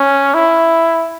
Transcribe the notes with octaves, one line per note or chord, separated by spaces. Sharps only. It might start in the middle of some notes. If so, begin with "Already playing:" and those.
Already playing: C#4
E4